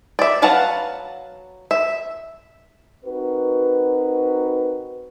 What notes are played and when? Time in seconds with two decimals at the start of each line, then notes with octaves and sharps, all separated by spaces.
0.19 D5 E5
0.42 F#3 B4 F5 F#5 A5
1.71 E5
3.05 C4 D#4 F#4 A#4 B4